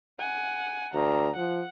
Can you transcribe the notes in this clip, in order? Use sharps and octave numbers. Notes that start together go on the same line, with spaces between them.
F#5 G#5
D2 A#5
F3 F#5